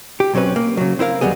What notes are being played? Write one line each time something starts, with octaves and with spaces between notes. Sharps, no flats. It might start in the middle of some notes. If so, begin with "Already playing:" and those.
G4
B1 F#3 C4 C#4 B4
A#3
C#3 F#3
C4 E4 A#4 F5
D#2 F#3 G3 B3 G#4